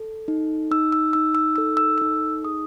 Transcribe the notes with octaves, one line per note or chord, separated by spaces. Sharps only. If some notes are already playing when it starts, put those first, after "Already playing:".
Already playing: A4
D#4
D#4 E6
E6
D#4 E6
E6
A4 E6
E6
D#4 E6
G#4 D#6